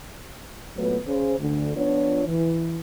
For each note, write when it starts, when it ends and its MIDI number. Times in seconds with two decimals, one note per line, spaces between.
0.77 0.98 46
0.77 0.98 54
0.77 0.98 57
0.77 0.98 59
0.77 0.98 71
1.07 1.34 49
1.07 1.34 72
1.39 1.72 38
1.39 1.72 50
1.76 2.23 53
1.76 2.23 59
1.76 2.23 62
1.76 2.23 65
1.76 2.23 73
2.26 2.80 52